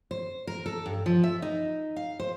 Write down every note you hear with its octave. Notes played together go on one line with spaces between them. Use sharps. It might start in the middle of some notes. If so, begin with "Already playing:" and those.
C5
A#4
A4
G2
F3
E5
D#4
F5
C5